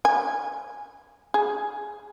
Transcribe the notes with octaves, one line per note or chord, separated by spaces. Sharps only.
G#5
G#4